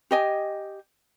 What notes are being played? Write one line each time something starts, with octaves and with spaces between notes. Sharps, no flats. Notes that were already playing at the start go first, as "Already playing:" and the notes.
G4 D#5 G#5